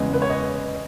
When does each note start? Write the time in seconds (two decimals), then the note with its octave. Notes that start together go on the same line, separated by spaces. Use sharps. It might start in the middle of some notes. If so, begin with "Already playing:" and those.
Already playing: E2 C#3 G#3 B3 D#5
0.13 B4
0.22 C#5
0.30 D#5